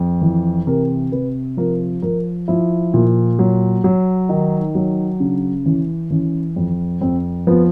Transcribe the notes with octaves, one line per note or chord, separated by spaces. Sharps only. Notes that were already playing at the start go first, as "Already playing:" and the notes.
Already playing: F2
E3
C3 A#4
C3 B4
F3 A#4
F3 A#4
F3 E4
A#2
F#3
F#3
D#3 D#4
F#3
C#3 D4
E3 C#4
E3 C#4
F2
F2 C4
F3 B3